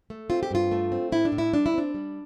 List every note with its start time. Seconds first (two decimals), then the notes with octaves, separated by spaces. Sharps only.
0.10 A3
0.30 C4 F4
0.43 G4
0.51 G2 F4
0.72 A3
0.92 C4
1.12 A2 E4
1.25 D4
1.32 A2
1.38 E4
1.53 G3 D4
1.66 E4
1.74 C4 D4
1.94 G3